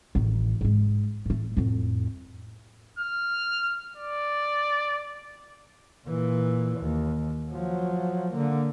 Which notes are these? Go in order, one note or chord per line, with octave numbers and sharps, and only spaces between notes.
A1 D#3
G#2 G#3
A2 A3
F2 A2
F6
D5
A#2 E3
D#2
F3 F#3
D3 A#3